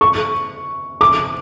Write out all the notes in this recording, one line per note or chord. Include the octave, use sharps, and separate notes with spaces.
C#6
D6